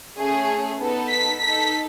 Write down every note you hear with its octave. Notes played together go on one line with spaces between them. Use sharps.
A3 C#4 G#4
B3 D#4 A4
B6
D#4 A4 B6